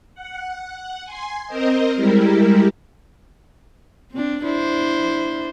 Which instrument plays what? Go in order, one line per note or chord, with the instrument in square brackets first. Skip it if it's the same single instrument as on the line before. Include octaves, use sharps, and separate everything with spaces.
[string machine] F#5
G#5 C6
C4 A#4 C5 D#5
G3 G#3 E4 G4 A#4
[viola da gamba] C4 D4
D4 E4 C5